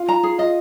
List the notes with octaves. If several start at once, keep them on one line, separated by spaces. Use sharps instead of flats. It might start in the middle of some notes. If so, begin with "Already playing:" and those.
Already playing: F4
A#5
G#4
F4 D#5